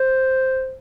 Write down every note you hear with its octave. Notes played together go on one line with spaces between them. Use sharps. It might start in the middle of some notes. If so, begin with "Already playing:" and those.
Already playing: C5